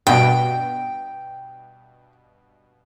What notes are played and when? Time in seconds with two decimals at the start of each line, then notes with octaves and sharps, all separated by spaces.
0.07 G2 B2 G5